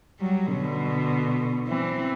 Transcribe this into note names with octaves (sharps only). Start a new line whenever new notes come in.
F#3 G3
B2 D3
E3 C4